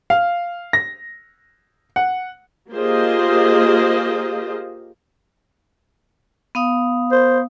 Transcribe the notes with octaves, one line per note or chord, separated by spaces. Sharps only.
F5
A#6
F#5
A#3 F4 G4 G#4 C5 D#5
B3 F5 D#6
C5